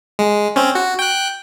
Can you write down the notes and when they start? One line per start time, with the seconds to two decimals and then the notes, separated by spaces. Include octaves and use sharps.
0.19 G#3
0.56 C4 C#4
0.75 F#4
0.99 G5 F#6